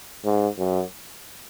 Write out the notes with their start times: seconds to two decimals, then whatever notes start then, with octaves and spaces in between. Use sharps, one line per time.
0.24 G#2
0.58 F#2